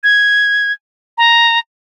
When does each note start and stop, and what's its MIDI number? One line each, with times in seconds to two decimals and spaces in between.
0.03 0.72 92
1.18 1.59 82